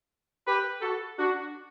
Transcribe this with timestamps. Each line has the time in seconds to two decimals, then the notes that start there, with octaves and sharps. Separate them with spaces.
0.46 G4 B4
0.81 F#4 A4
1.16 D4 F#4